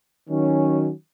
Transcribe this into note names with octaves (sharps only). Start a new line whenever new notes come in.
D#3 F#3 C#4